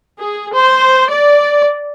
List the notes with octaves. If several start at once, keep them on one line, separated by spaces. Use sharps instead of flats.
G#4
C5
D5